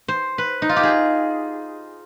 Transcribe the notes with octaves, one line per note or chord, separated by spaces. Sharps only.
C5
B4
D#4
F4
G4
G#4